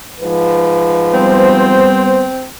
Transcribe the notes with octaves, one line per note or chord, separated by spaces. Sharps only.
G#2 F3 B4
G3 B3 C4 C5